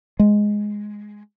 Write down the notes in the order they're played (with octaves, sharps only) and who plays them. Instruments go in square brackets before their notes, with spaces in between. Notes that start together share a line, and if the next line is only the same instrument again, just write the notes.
[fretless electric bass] G#3